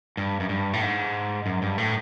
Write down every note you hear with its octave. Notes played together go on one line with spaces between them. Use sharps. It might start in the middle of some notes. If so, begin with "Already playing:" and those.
G2
F#2
G2
A2
G#2
F#2
G2
A2